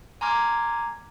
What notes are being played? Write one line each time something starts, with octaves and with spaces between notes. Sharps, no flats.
G#5 A#5 C6 D6 F6 G#6